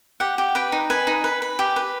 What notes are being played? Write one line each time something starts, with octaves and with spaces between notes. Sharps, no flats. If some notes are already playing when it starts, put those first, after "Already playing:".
G4 F#5
G4
B4 G5
D#4
B4 G#5
D#4
B4
B4
G4
B4